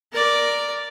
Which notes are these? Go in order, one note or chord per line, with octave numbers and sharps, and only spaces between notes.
A#4 D5